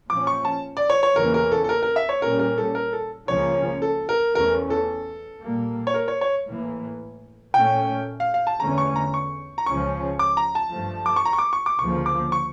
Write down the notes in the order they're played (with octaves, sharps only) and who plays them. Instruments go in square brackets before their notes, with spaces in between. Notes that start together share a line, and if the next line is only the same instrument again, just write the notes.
[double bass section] A#2 F3 C#4 [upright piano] D6
[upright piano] C#6
A5
D5
C#5
C#5
[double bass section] E2 C#3 E3 A#3 C#4 [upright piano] A#4
[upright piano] A#4
A4
A4
A#4
A#4
E5
C#5
[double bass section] A#2 G3 C#4 [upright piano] A#4
[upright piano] A#4
A4
A#4
A4
[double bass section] C#2 C#3 F3 A#3 C#4 [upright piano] C#5
[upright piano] A4
A#4
[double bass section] E2 E3 A3 C#4 [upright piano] A#4
[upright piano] A4
[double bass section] A#2 G3 A#3
[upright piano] C#5
A#4
C#5
C#5
[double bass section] A2 E3 A#3
[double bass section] A#2 A3 C#4 [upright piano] G5
[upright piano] F5
F5
A5
[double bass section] E2 D3 A3 C#4 [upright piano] A#5
[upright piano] C#6
A#5
C#6
A#5
[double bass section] C#2 C#3 F3 C#4 [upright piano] C#6
[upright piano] D6
A#5
A5
[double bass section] G2 F3 A3
[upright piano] D6
C#6
A#5
C#6
D6
C#6
D6
[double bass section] D2 C#3 F3 A#3 [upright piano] C#6
[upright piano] D6
C#6